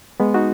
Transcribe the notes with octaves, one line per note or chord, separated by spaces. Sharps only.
G#3 B3
D#4 F#4